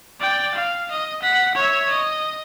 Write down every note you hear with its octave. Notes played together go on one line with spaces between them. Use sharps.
D5 G5
F5
D#5
F#5 B6
C#5 E5
D#5